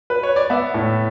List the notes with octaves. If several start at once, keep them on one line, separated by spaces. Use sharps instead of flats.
B4
C#5
D5
B3 E5
A2